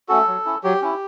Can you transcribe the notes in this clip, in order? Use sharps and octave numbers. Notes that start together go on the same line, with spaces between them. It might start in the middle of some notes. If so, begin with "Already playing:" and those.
A3 C#4 F#4 A4
F#3
C#4 E4
F#3 G4
C#4 E4